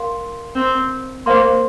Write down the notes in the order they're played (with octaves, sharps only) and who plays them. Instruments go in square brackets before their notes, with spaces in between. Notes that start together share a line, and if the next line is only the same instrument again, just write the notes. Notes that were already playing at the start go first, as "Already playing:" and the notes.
Already playing: [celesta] A#4 F5 C6
[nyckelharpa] C4
[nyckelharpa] A#3 [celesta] C5 F5 C6